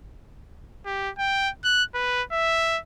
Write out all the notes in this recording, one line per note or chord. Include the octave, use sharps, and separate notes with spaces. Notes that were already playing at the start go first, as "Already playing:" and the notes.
G4
G5
F#6
B4
E5